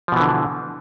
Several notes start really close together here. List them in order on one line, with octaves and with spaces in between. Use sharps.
F3 B2 E3 D3